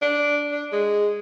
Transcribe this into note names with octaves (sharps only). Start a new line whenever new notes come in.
D4
D4
G#3